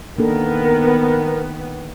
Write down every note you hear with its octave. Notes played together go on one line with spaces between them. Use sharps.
D#3 A#3 B3 D4 A4 A#4